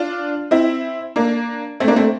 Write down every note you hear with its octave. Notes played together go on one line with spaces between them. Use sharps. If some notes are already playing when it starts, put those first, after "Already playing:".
Already playing: D4 F4
C4 E4
A#3 D4
A3 C4
A#3 D4
A3 C4